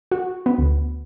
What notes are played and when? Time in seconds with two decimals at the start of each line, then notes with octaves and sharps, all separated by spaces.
0.12 F#4
0.46 B3
0.58 D2